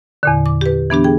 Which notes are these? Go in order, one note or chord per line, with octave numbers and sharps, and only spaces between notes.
E2 A#2 D3
D6
G4 B4
E3 B3 D4 G4
G#4 G5